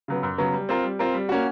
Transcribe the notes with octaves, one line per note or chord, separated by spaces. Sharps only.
C#3 F#3 B3
F#2
C#3 F#3 B3
G3
C4 F4 A#4
G3
C4 F4 A#4
G3
A#3 C#4 F#4